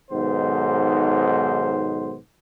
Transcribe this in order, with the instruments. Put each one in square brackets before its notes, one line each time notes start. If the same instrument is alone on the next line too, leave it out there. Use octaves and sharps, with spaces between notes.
[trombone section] B1 G#2 D#3 B3 C5